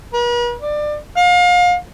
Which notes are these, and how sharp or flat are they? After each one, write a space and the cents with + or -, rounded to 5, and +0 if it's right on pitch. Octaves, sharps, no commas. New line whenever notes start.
B4 -45
D5 +25
F5 +35